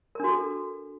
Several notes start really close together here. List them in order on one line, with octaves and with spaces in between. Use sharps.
A#4 D4 F#4 A4